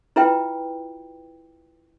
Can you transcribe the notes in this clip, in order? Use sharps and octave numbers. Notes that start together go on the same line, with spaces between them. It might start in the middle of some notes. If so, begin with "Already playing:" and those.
E4 F4 B4 E5 G5